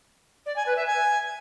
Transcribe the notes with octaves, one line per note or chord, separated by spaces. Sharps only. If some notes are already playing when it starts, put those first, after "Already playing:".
D5
G#5
B4
E5
G#5